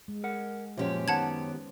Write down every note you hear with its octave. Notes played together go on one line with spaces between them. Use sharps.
G#3
A#4 F#5
F#2 A#2 F3 C#4 G4 C5 C#5
D#3 B3 F#5 A5 G#6